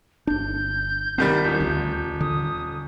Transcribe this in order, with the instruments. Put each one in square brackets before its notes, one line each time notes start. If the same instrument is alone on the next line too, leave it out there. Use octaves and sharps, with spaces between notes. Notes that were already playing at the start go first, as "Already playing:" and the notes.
[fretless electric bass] G1 D4 [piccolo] G6
[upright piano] C2 D#3 G3 [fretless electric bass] C4
[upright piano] D#1
[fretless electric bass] D2
[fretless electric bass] D3 [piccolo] D#6